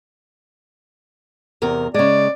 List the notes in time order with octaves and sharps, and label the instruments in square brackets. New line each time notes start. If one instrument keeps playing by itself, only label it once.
[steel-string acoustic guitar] E2 C3 A#4
[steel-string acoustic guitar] C#3 G#3 [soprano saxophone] D5